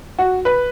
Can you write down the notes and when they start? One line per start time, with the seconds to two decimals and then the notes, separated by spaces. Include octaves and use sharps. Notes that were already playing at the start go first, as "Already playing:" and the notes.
0.19 F#4
0.45 B4